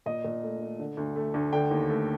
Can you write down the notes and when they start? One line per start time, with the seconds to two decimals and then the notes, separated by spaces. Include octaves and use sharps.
0.06 A#2 D#5
0.25 A#2
0.43 A3
0.61 A3
0.79 D3
0.97 D2
1.16 A3
1.34 D2
1.53 D3 G5
1.71 D#2
1.89 A3